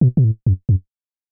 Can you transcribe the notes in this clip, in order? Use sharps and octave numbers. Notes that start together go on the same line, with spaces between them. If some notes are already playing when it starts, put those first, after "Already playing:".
B2
B2
A2
F#2
F#2